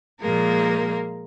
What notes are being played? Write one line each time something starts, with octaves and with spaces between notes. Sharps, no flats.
A#2 F3 G#3 A#3 A#4